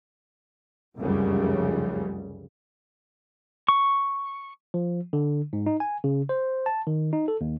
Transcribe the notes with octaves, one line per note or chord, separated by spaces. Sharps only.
F1 C#2 F#2 C#3 G3
C#6
F3
D3
G#2
D#4
G#5
C#3
C5
A5
D#3
D#4
A4
D#2